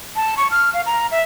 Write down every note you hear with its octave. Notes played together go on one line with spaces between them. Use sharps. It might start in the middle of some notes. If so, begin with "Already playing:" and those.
A5
C#6
F6
F5
A#5
E5